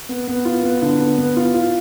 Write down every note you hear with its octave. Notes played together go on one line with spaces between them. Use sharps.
B3
B3
F4
B3
D3
B3
B3
F4
F4